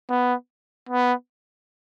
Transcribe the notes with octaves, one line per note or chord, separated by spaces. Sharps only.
B3
B3